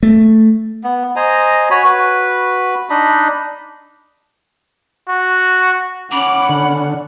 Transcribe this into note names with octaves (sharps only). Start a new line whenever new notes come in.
A3
B3
C5 D#5 G#5 A#5
F#4 C#5 G#5 B5
F#4 B4
D4 D#4 D#5 B5
F#4
C#4 F#5 B5 D6
D3